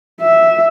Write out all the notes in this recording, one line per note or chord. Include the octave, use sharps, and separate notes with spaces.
E5